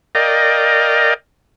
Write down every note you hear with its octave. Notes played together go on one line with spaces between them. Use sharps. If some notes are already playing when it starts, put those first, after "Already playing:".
A#4 D5 D#5 F5 G5